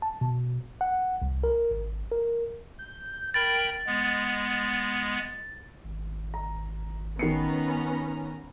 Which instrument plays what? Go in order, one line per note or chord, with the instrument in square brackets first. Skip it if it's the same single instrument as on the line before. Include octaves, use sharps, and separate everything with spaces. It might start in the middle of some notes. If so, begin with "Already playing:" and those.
[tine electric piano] A5
B2
F#5
C2
A#4
G#1
A#4
[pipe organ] G6
[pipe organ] A#4 G5 B5 [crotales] A6
[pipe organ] G#3 B3
[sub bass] G#1
[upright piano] A#5
[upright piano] D#3 C7 C#7 [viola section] B3 C#4 A#5